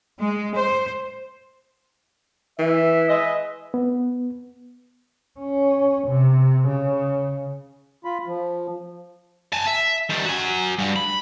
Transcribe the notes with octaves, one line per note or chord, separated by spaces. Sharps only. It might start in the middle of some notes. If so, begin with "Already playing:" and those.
G#3
C5
E3 E5
G#3 B4 D#5
B3
C#4
C3
C#3
F4 B5
F3
G#5 A5
E5
D#3 G3
F#4 G#5
G2
B5